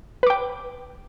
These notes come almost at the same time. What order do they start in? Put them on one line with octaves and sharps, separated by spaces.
B4 D6 G5